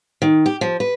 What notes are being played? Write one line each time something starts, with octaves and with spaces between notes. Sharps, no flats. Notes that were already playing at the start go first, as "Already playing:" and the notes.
D#3
G4
F3
B4